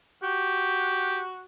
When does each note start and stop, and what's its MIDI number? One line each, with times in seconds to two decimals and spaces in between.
0.23 1.45 66
0.23 1.19 67